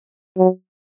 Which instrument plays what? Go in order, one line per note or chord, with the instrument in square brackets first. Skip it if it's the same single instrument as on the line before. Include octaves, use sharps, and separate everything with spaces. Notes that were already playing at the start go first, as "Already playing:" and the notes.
[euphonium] F#3